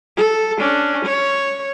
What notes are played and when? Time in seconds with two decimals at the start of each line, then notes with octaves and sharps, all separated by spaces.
0.17 A4
0.59 C#4 D4
1.05 C#5